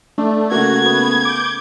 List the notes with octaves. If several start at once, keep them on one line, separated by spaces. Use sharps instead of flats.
A3 D4
C#3 A3 A#3 F#4 G#6
B3
D6 G6